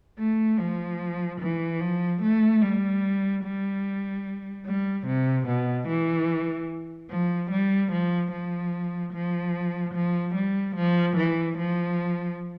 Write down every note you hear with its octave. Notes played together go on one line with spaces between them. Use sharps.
A3
F3
E3
F3
A3
G3
G3
G3
C3
B2
E3
F3
G3
F3
F3
F3
F3
G3
F3
E3
F3